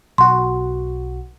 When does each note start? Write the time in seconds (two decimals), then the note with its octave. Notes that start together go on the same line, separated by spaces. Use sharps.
0.18 B1 F#4 C6